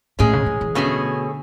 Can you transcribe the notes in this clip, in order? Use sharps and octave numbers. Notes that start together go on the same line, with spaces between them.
A2 G#3 C#4 G#4
C#3
E3
E3
B2 D3 A3 C#4 G#4